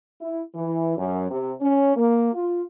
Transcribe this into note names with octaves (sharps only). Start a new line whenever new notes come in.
E4
E3
F#2
C3
C#4
A#3
F4